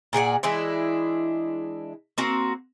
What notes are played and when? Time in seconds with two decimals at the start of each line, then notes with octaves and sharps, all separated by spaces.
0.13 A#2 G#4 D5 F#5
0.43 E3 G#3 D4 E4
2.18 A#3 C4 F#4